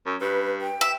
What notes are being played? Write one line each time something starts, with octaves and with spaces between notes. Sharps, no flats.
F#2
G2 B4
G5
E5